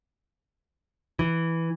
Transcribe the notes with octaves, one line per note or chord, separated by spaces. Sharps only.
E3